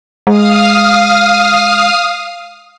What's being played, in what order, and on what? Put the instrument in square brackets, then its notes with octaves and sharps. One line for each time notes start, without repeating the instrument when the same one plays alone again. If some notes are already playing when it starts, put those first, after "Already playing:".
[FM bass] G#3 [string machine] F5 D#6 F6